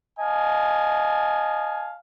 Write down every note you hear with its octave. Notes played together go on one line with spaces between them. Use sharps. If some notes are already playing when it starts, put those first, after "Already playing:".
D#5 F5 G#5 A5